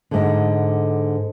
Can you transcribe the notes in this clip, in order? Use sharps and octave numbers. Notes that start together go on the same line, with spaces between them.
G#2 D3